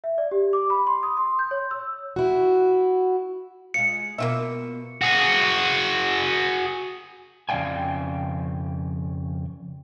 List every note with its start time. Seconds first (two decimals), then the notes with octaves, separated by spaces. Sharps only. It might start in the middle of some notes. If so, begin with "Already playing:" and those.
0.04 E5
0.18 D5
0.31 G4
0.53 D6
0.70 B5
0.87 C6
1.03 D#6
1.17 C6
1.39 G6
1.51 C#5
1.71 E6
2.16 E4 F#4
3.74 G#3 F4 C#7
4.18 B2 A#3 F4 E5
5.02 F#4 G#4
7.49 F2 C#3 D5 F5 G5 G#5